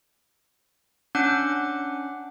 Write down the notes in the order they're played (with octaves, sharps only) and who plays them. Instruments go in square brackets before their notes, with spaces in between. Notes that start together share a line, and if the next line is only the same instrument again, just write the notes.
[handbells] C#4 D4 F#5 D6 F#6 C#7